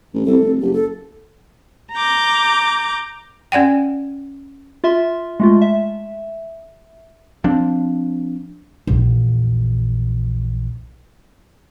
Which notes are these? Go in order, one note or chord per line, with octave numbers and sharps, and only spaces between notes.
A1
C2 A4
F1
F#1 G4
A4
A#5 D6 G6
C#4 D5 F#5 G5
F4 E5 C6
G#3 A3 F4
E5
F3 C4 D4
A#1 E2